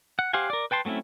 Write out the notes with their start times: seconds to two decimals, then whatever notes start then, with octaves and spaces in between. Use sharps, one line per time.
0.19 F#5
0.33 G4 C5 F5 F#5 G#5
0.50 A#4 D5
0.71 B4 G5 A5 C6
0.85 F#3 A3 C4 C#4 E4